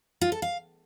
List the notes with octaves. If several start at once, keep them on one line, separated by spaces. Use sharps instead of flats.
F4
A4
F5